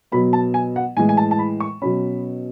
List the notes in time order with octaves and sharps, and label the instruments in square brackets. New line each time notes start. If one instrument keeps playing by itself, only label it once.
[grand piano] B2 F#3 B3 B5
A5
G#5
F#5
A2 E3 G#3 G#5
G#5
A5
A5
B5
C#6
B2 F#3 C#4 B5